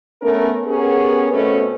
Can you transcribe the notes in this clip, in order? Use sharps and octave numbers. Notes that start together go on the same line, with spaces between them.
A3 B3 C#4 A#4
B3 C#4 G4 G#4 A#4
B2 A3 C4 C#4 B4